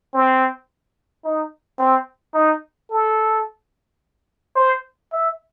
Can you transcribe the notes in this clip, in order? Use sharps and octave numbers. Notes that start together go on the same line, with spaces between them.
C4
D#4
C4
D#4
A4
C5
E5